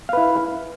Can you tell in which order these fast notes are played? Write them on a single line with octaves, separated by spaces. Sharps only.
F5 B4 E4